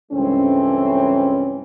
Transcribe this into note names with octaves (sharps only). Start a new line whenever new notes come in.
C#2 G2 E3 A3 C4 C#4